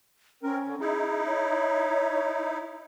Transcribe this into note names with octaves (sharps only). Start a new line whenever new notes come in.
C4 C#4 A#4
D3
D#4 E4 G#4
C#5